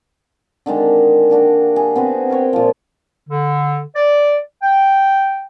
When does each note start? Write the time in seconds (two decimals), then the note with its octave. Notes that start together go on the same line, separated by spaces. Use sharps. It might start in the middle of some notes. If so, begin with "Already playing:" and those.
0.66 D3 D#3 G#3 D4
1.30 A#3 D4 F#4 G4
1.76 G#4
1.95 B3 C4 F#4 B4
2.30 A#4 C5 C#5 G5
2.53 A#2 F3
3.28 D3
3.95 D5
4.62 G5